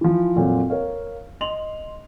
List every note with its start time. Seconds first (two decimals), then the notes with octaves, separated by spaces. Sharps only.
0.01 E3 F3
0.36 F2 A#2 F#3 C4
0.70 A#4 C#5 F5
1.41 D#5 C6 F7 F#7